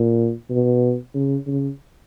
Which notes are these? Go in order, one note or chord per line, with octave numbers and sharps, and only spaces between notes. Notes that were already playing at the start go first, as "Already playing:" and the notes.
Already playing: A#2
B2
C#3
C#3